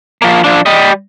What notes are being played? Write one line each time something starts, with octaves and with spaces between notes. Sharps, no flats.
F3 A#3
F3 D4
G3 D#5